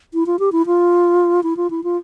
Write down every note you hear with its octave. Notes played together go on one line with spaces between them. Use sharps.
E4
F4
G4
E4
F4
E4
F4
E4
F4